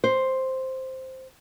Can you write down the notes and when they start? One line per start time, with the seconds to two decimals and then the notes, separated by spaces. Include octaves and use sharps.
0.04 C5